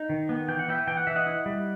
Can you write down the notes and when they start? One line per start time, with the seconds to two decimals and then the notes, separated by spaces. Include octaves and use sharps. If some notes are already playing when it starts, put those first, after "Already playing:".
Already playing: D#4
0.09 D#3
0.29 B3
0.48 E3 G5
0.59 F#5
0.68 B3 E5 G5
0.87 E3 G5
0.97 F#5
1.07 E3 E5
1.16 D#5 F#5
1.27 E4
1.46 G3